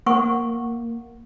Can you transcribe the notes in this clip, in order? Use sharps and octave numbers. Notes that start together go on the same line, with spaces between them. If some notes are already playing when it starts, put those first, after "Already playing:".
A#3 F#5 C#6